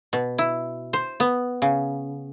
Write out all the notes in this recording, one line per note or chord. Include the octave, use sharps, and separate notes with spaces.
B2
E4
C5
B3
C#3